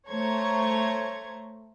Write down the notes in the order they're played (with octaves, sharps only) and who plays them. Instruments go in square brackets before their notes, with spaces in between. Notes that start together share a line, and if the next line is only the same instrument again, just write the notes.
[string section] A3 C5 C#5 A#5 C#6 G#6